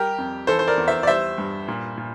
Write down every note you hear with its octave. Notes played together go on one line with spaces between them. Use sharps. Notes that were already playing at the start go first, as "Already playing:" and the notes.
Already playing: G3 G4 A#4
F2
E3 A4 C5
C5
A#4 D5
E2
C5 E5
D5
G3 C5 E5
G2
A#2
A#2